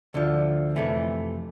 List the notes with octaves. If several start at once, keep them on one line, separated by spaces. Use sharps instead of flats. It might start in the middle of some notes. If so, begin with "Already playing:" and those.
D2 D3 F3
F2 C3 E3 A3